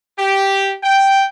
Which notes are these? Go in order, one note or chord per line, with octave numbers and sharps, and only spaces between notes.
G4
G5